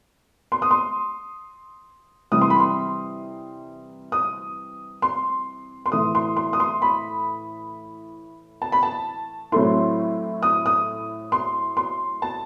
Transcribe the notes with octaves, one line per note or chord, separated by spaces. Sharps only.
C6
D#6
C6
C3 E3 G3 D#6
C6
B5
C6
D#6
C6
C6
A2 E3 A3 D#6
C6
C6
D#6
C6
B5
A5
B5
A5
A2 F#3 A3 C4 E4 C6
D#6
D#6
C6
C6
A5